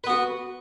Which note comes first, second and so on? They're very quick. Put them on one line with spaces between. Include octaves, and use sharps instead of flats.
B4 B3 F#4